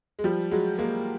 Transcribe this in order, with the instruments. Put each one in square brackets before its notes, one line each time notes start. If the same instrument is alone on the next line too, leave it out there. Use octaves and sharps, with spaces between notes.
[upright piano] G#3
F3 G3
F#3 G#3
G#3 A#3